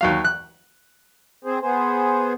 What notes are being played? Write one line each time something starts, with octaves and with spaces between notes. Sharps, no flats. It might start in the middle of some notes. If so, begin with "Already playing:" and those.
D#2 F#3 F5
F#6
C4 G#4 C5
B3 G#4 C5